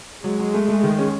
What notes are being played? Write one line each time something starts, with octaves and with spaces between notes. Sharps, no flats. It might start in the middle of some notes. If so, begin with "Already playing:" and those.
F#3 G#3
F#3
A3
A3
D#3
C#4